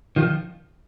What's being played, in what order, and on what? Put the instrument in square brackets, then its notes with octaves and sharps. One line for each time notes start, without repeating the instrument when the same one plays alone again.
[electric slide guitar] D#3 F3